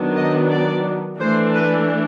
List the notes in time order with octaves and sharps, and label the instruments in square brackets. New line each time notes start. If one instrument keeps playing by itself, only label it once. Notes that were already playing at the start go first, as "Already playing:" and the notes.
Already playing: [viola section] D#3 F#3 B3 D4
D#5
D5
E3 A3 D4 C5
B4